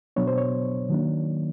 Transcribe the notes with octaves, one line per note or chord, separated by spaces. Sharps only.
B2 F#3 B3 D4 C#5
C5
C#5
D#3 F#3 A#3 D4